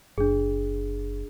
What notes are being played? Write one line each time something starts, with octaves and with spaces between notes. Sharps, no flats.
F#1 D4 G#4